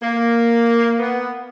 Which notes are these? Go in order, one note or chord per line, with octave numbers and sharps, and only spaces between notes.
A#3
B3